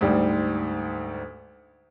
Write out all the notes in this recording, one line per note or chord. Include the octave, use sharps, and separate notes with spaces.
D2 G#2 G3